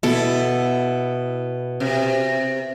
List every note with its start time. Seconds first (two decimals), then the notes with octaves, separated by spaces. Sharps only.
0.03 B2 E4 A4
1.80 C3